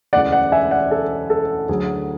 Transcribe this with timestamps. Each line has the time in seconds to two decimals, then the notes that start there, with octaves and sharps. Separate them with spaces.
0.13 E1 D2 C#3 E3 D5 F#5
0.32 D5 F#5
0.52 E5 G#5
0.71 D5 F#5
0.91 A4
1.30 A4
1.69 D2 D3 F#3 G#4